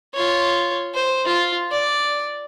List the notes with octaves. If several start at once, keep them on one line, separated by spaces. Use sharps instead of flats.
F4 C#5
C5
F4
D5